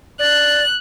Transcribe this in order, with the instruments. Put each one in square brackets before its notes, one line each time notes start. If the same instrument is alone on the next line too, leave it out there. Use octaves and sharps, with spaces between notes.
[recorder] D5 [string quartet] F#6